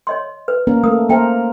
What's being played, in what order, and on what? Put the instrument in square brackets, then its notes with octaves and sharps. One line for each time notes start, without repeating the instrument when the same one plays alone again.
[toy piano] C#5 D#5 C6
B4
[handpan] A#3 C#4 A#4
[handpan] A3 [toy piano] A#4 D#6
[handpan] A#3 A#4 C5 [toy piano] E5 G5 A5